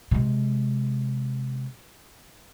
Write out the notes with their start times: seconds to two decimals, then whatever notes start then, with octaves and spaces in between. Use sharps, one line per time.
0.11 C3 G#3